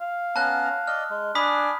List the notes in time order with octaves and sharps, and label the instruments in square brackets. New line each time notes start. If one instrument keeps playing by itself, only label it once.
[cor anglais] F5
[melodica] B3 C#4 A#5 [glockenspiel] A5 F#6
[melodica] D5 D#5 [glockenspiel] F6
[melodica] G#3
[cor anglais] D4 [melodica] G#5 [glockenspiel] B5 D#6 B6